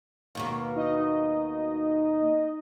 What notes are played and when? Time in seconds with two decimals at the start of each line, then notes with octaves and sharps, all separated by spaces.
0.35 D#2 B2 A#3
0.76 D#4 D#5